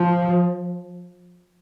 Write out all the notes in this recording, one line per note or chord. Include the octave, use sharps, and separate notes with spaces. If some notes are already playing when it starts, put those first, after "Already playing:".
Already playing: F3